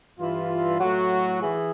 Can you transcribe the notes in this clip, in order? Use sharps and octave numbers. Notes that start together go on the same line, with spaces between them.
G2 E3 F4
A2 F#3 F#4
E3 G#4